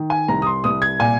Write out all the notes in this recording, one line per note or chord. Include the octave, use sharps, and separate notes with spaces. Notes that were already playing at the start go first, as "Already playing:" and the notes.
Already playing: D#3
G#5
C2 A#5
D#6
C6
C2 D#6
G#6
A#2 G#5